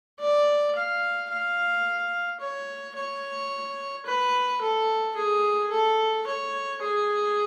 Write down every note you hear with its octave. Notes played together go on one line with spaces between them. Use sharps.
D5
F5
F5
C#5
C#5
B4
A4
G#4
A4
C#5
G#4